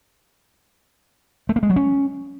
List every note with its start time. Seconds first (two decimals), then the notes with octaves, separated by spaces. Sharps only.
1.49 A3
1.56 A#3
1.63 G#3
1.70 F#3
1.76 C#4